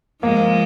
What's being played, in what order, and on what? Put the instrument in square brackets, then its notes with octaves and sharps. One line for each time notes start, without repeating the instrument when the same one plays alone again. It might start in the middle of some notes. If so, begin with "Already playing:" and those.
[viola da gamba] F3 G#3 [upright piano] A#3